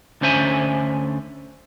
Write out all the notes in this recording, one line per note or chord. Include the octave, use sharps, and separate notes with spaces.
D2 D3 C#4 C5 E5 G#5